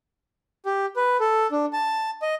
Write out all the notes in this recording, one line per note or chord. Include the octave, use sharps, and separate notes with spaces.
G4
B4
A4
D4
A5
D#5